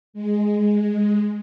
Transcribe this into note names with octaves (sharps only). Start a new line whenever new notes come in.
G#3